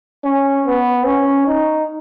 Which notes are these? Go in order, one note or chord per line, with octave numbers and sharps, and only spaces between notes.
C#4
B3
C#4
D#4